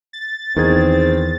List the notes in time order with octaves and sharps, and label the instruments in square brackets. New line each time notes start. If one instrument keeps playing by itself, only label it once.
[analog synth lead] A6
[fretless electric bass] E2 [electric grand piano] D#3 G#4 G#6 [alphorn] C4